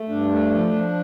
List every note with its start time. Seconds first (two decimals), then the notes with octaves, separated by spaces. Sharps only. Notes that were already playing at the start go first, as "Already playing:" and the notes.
Already playing: A3
0.09 G2 D4
0.30 A3
0.51 F3
0.73 F3